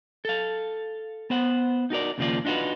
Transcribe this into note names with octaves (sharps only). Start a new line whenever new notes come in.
A4 F5
B3 C5 F#5
D#4 F#4 A#4 D5
D#2 C#3 F3 A#3 F4 D5
D4 D#4 F4 F#4 B4